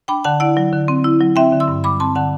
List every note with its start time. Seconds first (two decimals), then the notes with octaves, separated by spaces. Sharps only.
0.08 D4 G5 B5
0.24 D3 F#5 A5
0.40 E4 D5 F#5
0.57 F#3
0.73 D3
0.88 C4
1.04 E4
1.21 F#3
1.36 C4 E5 G5
1.53 D3
1.60 C6 E6
1.68 G2
1.84 G3 B5 D6
2.00 C4 A5 C6
2.15 D3 F#5 A5